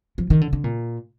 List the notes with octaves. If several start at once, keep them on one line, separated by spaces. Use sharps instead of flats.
F3
D#3
D3
D3
A#2